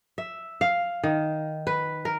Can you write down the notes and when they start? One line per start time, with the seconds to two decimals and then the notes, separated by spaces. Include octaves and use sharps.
0.18 E5
0.61 F5
1.03 D#3
1.67 B4
2.05 A#4